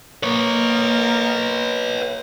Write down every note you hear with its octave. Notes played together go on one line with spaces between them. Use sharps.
A#3 A#4 B4 C#5